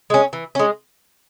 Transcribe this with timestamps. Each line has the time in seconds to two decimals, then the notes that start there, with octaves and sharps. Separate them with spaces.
0.10 G#3 C#4
0.33 E3
0.55 G#3 C#4